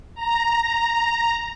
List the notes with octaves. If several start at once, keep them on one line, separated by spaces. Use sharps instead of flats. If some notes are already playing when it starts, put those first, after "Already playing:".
A#5